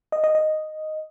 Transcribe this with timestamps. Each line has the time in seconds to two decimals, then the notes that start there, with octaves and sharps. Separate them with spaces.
0.12 D#5
0.24 D#5
0.35 D#5